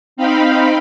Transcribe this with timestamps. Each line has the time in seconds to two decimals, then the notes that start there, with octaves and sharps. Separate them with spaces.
0.17 C4 D#4 F5 G5 B5